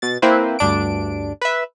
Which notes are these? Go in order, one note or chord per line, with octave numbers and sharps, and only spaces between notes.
B2 A6
A#3 C4 E4 B4 C5
D2 G2 D4 D7
B4 E5